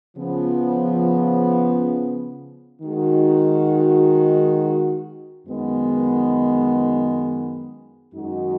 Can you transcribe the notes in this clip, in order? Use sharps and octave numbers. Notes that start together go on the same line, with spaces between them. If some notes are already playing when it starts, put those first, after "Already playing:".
C#3 F3 B3
D#3 G#3 D#4 F#4
F#2 D#3 G#3 B3
F#2 D#3 G#3 D#4 F#4